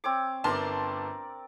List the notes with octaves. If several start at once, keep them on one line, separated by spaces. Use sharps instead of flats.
C4 C#5 D6
G1 A#4 D5 A5 C6